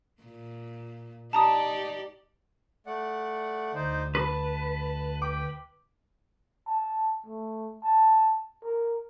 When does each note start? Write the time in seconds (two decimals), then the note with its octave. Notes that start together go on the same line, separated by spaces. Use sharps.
0.23 A#2
1.33 D#4 G4 D5 A5 A#5 D#6
2.86 A3 D5 F#5
3.75 D2 D#4 C5 D5
4.15 B4 A5
5.22 G5 D6
6.67 A5
7.26 A3
7.84 A5
8.63 A#4